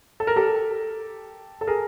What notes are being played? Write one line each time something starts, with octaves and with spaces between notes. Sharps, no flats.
A4
A#4
G4 A4
A4
G#4 A#4